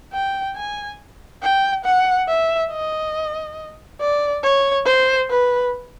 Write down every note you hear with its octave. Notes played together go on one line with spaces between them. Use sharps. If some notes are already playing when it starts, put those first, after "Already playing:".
G5
G#5
G5
F#5
E5
D#5
D5
C#5
C5
B4